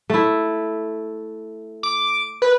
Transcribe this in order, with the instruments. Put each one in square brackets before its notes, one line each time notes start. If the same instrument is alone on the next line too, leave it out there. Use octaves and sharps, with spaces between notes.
[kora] A3 E4
[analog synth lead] D6
B4